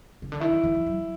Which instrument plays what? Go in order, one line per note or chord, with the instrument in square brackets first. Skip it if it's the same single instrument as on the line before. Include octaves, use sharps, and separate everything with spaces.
[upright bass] C#3
D3
[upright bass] D#3 [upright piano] E4
[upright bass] D#3
E3
F3
F#3